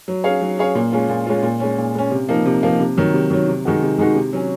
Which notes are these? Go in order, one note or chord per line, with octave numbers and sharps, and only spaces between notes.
F#3
C#4 G#4 C#5 F5
F#3
C#4 G#4 C#5 F5
A#2
G#3 C#4 F4
A#2
G#3 C#4 F4
A#2
G#3 C#4
A#2
G#3 C#4
C3
F3 A#3 D#4
C3
F3 A#3 D#4
C3
D#3 F#3
C3
D#3 F#3
C3
D#3 G#3 D#4 F#4
C3
D#3 G#3 D#4 F#4
C3
F#3 C#4